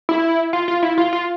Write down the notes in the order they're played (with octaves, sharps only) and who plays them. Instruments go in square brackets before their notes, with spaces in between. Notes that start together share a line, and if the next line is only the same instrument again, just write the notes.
[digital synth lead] E4
F4
F4
E4
F4
F4